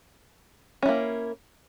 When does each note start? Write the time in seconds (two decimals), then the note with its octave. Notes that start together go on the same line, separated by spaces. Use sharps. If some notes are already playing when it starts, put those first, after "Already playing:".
0.83 C#4
0.86 E4
0.89 A#3